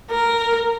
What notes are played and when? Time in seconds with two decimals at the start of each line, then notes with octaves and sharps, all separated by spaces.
0.10 A#4